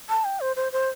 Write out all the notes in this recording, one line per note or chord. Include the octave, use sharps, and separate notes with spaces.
A5
G5
C5
C5
C5